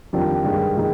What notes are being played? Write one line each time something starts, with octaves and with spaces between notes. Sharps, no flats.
F2 D#3 G3 D4 F4
G2 D#3 G#3
D#3 G#3 D#4